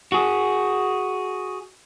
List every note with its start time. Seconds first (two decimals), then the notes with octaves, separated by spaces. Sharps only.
0.12 F#4 G#4